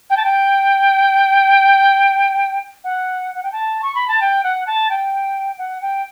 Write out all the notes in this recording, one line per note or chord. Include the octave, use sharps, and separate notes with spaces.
G5
A5
G5
F#5
F#5
G5
A5
C#6
B5
A5
G5
F#5
A5
G5
F#5
G5